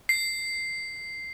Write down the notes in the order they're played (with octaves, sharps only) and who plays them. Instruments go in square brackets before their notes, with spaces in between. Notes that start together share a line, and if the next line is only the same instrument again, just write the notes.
[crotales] C7